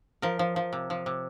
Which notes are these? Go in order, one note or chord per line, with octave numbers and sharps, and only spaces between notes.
F3 A#4
F3
F3
C3
F3
C3